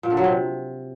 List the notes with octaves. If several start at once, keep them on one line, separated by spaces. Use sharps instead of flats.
A#2
D3
F#3
C3